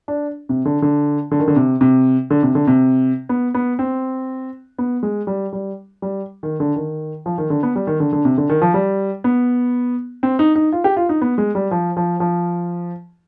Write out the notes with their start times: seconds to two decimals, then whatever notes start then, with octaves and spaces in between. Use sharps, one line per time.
0.08 D4
0.49 C3
0.65 D3
0.82 D3
1.31 D3
1.40 D#3
1.48 D3
1.56 C3
1.81 C3
2.30 D3
2.43 C3
2.55 D3
2.67 C3
3.29 B3
3.55 B3
3.79 C4
4.78 B3
5.03 G#3
5.27 G3
5.53 G3
6.02 G3
6.43 D#3
6.60 D3
6.76 D#3
7.26 F3
7.38 D#3
7.50 D3
7.63 B3
7.76 G3
7.87 D#3
8.00 D3
8.13 D3
8.25 C3
8.38 D3
8.49 D#3
8.62 F3
8.74 G3
9.24 B3
10.23 C4
10.39 D#4
10.56 D#4
10.72 F4
10.84 G4
10.97 F4
11.09 D#4
11.22 B3
11.38 G#3
11.55 G3
11.71 F3
11.97 F3
12.20 F3